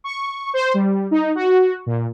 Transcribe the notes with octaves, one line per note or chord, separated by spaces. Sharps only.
C#6
C5
G3
D#4
F#4
A#2